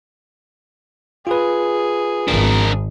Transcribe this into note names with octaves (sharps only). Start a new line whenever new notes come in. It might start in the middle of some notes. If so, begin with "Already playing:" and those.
F4 G#4 B4
G#1 D4 A#4